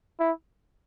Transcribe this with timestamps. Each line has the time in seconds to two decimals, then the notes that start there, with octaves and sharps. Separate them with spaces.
0.20 E4